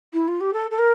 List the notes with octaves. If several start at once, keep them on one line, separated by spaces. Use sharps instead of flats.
E4
F4
G4
A4
A4
A#4